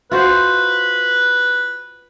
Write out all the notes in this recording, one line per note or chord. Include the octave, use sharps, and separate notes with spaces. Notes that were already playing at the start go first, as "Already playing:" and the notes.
F4 F#4 B4 C5